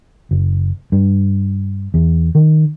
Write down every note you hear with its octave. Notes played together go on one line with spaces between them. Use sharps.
F#1
G2
E2
D#3